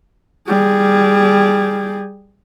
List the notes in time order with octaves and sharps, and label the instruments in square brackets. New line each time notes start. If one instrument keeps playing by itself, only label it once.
[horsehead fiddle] G3 G#4